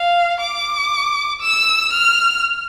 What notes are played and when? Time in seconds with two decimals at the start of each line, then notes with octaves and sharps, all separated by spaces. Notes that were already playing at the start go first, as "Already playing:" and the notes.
Already playing: F5
0.40 D6
1.41 E6
1.93 F6